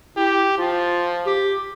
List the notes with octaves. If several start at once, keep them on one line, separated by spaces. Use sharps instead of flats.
E4 G4
F3 F4
G4